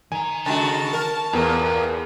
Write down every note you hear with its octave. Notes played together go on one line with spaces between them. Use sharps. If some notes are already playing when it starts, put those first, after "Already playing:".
D#3 G#5 A#5
C#3 G#3 F#4 A5
A#4
E2 A2 A#3 B3 A#4 D5 A#5